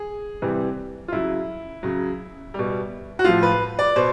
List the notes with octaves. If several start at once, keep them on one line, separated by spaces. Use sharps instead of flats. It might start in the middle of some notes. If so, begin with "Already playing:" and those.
Already playing: G#4
C3 E3 G3
F4
C#3 F#3 E4
C#3 F#3
B2 G3
F#4
A2 F3 F4
B4
D5
B2 C5